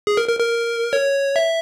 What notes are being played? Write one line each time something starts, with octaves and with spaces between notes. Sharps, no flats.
G#4
A#4
A#4
A#4
C#5
E5